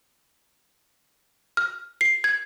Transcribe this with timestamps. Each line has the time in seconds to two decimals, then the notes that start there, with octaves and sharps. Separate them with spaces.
1.57 F6
2.01 C7
2.24 G#6